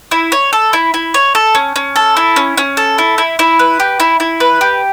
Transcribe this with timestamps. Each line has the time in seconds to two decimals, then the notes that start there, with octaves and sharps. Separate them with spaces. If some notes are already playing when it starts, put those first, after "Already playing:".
0.11 E4
0.32 C#5
0.53 A4
0.73 E4
0.94 E4
1.14 C#5
1.35 A4
1.55 C#4
1.76 C#4
1.96 A4
2.17 E4
2.36 C#4
2.57 C#4
2.77 A4
2.98 E4
3.18 E4
3.39 E4
3.59 B4
3.80 G4
4.00 E4
4.20 E4
4.40 B4
4.61 G4